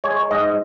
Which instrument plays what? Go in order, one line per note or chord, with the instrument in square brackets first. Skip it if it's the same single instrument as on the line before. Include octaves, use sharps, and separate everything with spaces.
[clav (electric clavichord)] G#3 C#5
G#2 D#5